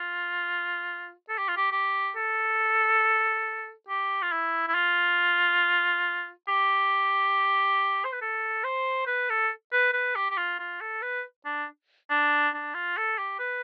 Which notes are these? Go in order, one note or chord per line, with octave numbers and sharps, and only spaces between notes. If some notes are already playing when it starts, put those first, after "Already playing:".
Already playing: F4
A4
G4
F4
G4
G4
A4
G4
F4
E4
E4
F4
G4
C5
B4
A4
C5
B4
A4
B4
B4
G4
G4
F4
F4
A4
B4
D4
D4
D4
F4
A4
G4
B4